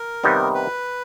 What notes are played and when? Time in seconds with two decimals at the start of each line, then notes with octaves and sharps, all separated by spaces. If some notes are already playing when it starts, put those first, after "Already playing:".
Already playing: A#4
0.24 C3 D#3 G3 B3 D#4
0.55 B4